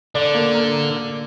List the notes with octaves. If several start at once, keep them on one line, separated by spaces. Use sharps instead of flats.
D3 D5
A#3
A#4